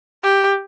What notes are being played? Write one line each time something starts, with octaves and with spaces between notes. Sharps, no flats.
G4